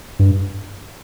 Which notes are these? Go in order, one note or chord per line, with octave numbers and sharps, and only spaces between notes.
G2